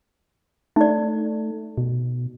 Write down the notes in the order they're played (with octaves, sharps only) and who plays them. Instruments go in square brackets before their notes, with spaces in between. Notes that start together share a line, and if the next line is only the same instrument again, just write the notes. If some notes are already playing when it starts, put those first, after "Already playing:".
[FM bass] A3 [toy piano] D#4 D5
[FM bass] B2